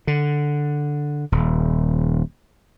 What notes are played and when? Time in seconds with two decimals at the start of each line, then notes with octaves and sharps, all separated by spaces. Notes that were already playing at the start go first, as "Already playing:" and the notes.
0.07 D3
1.32 D#1